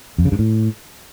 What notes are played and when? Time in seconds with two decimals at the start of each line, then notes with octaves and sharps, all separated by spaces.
0.18 F2
0.25 C#3
0.32 G2
0.39 A2